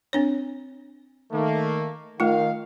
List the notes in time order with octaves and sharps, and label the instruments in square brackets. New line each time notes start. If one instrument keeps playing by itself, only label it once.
[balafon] C4 D4 C#5
[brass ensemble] D#3 A3 A#3
[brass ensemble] D#3 F5 [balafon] A3 F4